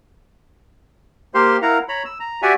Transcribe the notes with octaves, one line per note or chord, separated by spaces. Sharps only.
A#3 G4 C5 F5 C6
E4 A#4 F5 F#5 A#5
C#5 A#5 B5
E6
A#5
F#4 G4 D5 E5 F#5 G#5